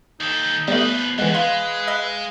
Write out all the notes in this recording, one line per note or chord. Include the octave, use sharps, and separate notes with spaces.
D#2 D#4 A4
F3 G3 A3 B3 B4
D#2 D3 E3 G#3 F#5
G#3 B4 F5 C6
D#5 E6